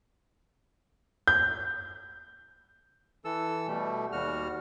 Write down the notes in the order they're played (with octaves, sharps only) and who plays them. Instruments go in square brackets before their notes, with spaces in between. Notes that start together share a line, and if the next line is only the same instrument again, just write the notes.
[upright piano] G6
[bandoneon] E3 A4 E6
B2 G3 A3
D#2 G3 F#4 F6